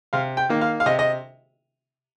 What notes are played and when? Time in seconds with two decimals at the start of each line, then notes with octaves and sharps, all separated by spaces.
0.13 C3 F5
0.37 G5
0.49 D#3 A#3
0.61 F5
0.80 F5
0.86 C3 D#5
0.99 D#5